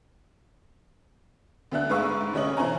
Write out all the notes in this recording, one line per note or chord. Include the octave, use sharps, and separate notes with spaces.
D2 B3 D4 E5 F#6
G#2 G#4 B4 F5 C#6 E6
G#2
D2 C3 C#4 C#5 D#5 F#7
B2 E3 C5 G#5 A#5